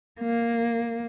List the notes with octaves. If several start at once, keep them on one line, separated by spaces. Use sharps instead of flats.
A#3